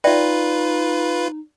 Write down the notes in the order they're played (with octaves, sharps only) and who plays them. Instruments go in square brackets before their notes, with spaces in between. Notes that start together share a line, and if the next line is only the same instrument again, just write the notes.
[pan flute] D#4 [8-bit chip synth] F4 B4 [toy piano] D5 E5 G5